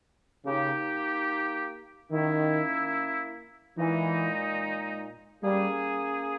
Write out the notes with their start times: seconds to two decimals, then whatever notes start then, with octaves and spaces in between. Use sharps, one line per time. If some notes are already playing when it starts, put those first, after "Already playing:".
0.45 C#3 A#3 D#4 G4
2.11 D#3 A#3 C#4 E4
3.77 A#2 E3 G#3 D#4
5.43 G3 A#3 C#4 G#4